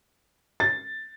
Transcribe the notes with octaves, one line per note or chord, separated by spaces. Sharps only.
A6